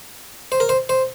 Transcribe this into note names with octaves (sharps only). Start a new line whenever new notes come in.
C5
A#4
C5
C5